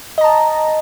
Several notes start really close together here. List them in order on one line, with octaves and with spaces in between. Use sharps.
D#5 A#5 A5